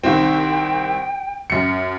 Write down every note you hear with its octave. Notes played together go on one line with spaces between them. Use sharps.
C2 D#3 C4 G5
F#2 C#7